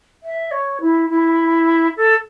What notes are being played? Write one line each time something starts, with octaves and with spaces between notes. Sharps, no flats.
E5
C#5
E4
E4
A4